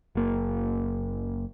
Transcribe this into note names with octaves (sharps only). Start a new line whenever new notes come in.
F#1 A#3